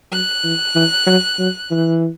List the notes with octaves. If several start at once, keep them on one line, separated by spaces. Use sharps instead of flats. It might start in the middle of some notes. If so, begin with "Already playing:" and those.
F#3 F#6
E3
E3
F#3
F#3
E3